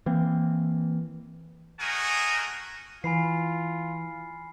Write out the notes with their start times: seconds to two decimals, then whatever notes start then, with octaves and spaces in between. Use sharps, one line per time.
0.06 E3 A#3 C4
1.79 A3 F#4 G#4 A#4 D#5 G#5
3.04 E3 F4 G#5 B5 C7